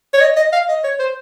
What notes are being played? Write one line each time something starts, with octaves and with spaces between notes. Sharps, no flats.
C#5
D#5
D#5
F5
D#5
C#5
C5